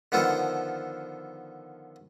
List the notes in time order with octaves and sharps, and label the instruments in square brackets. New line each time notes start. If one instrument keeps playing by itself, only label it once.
[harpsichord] D3 D#3 F3 B3 F4 A4